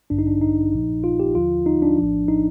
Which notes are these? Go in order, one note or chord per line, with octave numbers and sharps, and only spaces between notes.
A1 G2 D3 D4
D#4
D4
D#4
A#1 A#2 F3
F4
G4
D#2 D3 F3 F4
D#4
D4
A#1 A2 F3
D#4